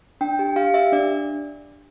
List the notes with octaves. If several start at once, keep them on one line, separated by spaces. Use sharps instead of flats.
D4 G5
G4
G4 F5
G4 E5
D4 D5